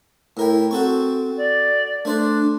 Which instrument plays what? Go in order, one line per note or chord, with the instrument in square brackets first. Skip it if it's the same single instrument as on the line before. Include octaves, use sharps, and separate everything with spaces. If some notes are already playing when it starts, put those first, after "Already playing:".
[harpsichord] A2 A#4 G5 [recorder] E4
[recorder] C4 [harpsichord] F#4 A4 C#6
[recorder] D5
[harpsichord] A3 C5 D5 [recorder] D4